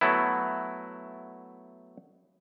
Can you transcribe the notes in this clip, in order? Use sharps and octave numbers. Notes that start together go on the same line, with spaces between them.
F#3 A3 B3 E4